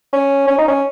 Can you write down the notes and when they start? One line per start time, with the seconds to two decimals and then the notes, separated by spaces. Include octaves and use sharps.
0.13 C#4
0.48 C#4
0.58 D#4
0.68 C#4